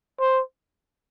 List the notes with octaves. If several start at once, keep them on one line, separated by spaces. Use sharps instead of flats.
C5